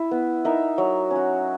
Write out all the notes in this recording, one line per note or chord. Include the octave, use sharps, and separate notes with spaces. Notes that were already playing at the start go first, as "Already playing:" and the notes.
Already playing: E4 E5
B3
D#4 A#4 E5
F#3
C#4 F#4